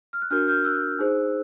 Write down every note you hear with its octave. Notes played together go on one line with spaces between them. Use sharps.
F6
F#6
D4 F#4 A#4 F6 G6
F6 G6
E6 F#6
D#4 G#4 C5